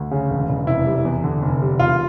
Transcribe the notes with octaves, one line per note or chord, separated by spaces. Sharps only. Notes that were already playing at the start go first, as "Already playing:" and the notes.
Already playing: D2
C#3
E1
E1
F1 E4
G3
E2
D3
F1
G3
E1 F4